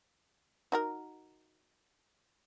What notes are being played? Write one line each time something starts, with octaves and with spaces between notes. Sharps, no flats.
D#4 F#4 A#4